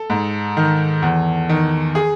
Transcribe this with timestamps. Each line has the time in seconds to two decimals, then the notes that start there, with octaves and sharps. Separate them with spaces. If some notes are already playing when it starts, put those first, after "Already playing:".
Already playing: A4
0.10 G#2
0.57 D#3
1.02 E2
1.49 D#3
1.95 G#4